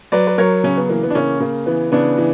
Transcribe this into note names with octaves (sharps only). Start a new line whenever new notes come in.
F#3 B4 D5
B4
F#3 A#4 C#5
C#3 C#4
B3
E3 A#3
B3
D4
C#3 A#3 C#4
C#3 A#3
E3 B3
C#3 B3 D4
E3